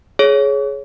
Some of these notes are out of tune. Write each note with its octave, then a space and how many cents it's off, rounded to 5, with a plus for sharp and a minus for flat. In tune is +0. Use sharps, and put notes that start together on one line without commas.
G#4 +15 C#5 +0